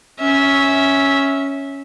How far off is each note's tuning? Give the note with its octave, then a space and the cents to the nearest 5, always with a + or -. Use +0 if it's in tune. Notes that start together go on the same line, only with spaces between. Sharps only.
C#4 +0 E5 -15